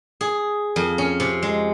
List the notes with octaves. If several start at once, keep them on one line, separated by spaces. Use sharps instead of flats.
G#4
F2
C#4
C3
G#3